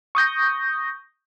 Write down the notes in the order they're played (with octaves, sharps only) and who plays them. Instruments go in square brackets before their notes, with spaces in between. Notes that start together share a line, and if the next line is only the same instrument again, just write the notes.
[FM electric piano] C#6 D#6 G6 A#6